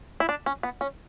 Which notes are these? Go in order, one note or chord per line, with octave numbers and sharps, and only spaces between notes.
E4
D4
C#4
B3
C#4